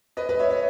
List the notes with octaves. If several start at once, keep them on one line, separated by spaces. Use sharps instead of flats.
B4 D#5
B4 D#5
C#5 E5
C#5 E5